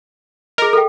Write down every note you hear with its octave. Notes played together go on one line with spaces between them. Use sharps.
G#4 A#4 D#5
A4 F5 G5